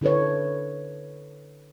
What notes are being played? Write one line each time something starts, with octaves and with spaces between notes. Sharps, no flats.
D3 E4 A4 B4 C#5